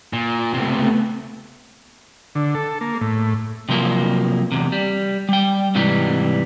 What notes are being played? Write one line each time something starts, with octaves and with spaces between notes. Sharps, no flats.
A#2
C#2 C3 A3 B3
D3
A4
A#3
A2
C3 F3 F#3 A#3
E2 C3
G3
G3 G5
G#2 C3 E3 G3